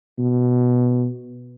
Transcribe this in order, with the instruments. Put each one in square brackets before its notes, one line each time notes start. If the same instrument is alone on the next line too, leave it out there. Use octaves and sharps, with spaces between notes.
[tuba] B2